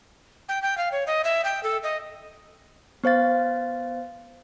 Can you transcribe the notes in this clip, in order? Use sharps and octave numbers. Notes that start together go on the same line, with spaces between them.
G5
G5
F5
C#5
D#5
E5
G5
A4
D#5
B3 C5 F5 A6